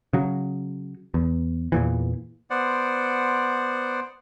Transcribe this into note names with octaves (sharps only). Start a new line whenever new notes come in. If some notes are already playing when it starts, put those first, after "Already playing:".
C#3 F#3
E2
E2 A#2 E3
B3 C5 D5 F#5